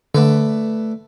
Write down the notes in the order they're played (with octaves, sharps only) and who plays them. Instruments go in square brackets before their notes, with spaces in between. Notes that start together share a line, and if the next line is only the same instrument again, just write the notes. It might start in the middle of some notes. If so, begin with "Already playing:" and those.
[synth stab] D3 [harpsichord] A3 B4 D5